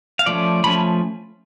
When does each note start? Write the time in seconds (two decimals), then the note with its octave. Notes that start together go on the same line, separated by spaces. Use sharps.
0.19 F5
0.26 F3 A3 C#4 D5
0.64 F3 A3 C#4 B5